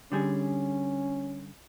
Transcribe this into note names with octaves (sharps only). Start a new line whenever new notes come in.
D3 G3 C#4 G#4